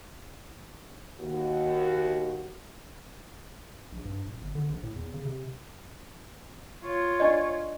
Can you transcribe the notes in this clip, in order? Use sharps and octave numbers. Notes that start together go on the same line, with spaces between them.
D#2 F#4
A#1
G2
D#1
G1
D3
A#1
A2
E2
C#3
C3
F4 C#5
D4 D5 D#5